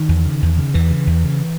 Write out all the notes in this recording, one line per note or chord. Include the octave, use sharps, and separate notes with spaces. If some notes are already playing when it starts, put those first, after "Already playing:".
Already playing: D#3
E2
C#3
E2
C#3
E2 E3
C#3
E2
C#3